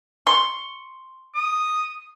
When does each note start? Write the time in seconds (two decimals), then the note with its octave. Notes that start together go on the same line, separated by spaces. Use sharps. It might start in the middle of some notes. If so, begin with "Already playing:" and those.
0.27 C6 C#6
1.35 D#6